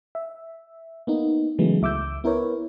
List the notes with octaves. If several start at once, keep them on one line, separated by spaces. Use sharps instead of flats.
E5
A#3 B3 D#4
C#3 E3 F#3 G#3 A3 B3
C#2 E5 D6 E6 G6
B3 E4 A#4 B4 C#5